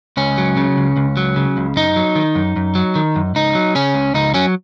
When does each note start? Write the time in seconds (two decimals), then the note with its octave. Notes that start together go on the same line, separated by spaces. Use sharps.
0.17 C#2 C#4
0.38 F#3
0.57 C#3
0.77 C#2
0.97 C#2
1.17 F#3
1.36 C#3
1.57 C#2
1.76 F#2 D#4
1.96 F#3
2.16 D#3
2.35 F#2
2.56 F#2
2.75 F#3
2.95 D#3
3.16 F#2
3.35 C#2 D#4
3.55 F#3
3.75 C#3 C#4
3.94 C#2
4.14 C#2 D#4
4.34 F#3 C#4